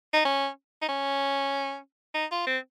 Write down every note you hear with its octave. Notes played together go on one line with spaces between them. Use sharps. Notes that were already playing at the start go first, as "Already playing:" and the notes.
D#4
C#4
D#4
C#4
D#4
F4
C4